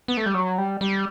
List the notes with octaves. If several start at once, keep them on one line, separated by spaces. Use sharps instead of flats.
B3
A3
G3
F#3
G3
G3